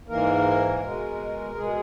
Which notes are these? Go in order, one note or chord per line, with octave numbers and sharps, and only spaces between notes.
G#2 E3 A#3 A#4
B2 G#3
B2 G#3 G#4